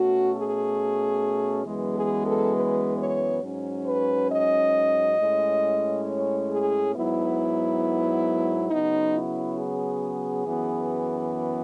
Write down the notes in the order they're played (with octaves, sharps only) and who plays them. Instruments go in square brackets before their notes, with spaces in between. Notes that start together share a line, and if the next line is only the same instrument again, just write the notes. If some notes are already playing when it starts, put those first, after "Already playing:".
Already playing: [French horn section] B2 A3 C#4 F#4
G#4
F#2 E3 G#3 B3
G#4
A4
B4
C#5
G#2 F#3 C#4
B4
D#5
A2 G#3 C#4
C#5
G#4
G#2 F#3 B3 E4
C#3 F#3 B3 D#4
E4
G#4
F#2 E3 B3